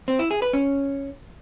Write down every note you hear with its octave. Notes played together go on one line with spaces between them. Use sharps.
C4
E4
G#4
B4
C#4